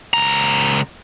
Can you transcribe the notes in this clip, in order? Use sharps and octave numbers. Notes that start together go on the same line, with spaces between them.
C#2 A#5